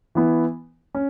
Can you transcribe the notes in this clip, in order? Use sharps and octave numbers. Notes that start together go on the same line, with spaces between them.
E3 B3 E4
C#4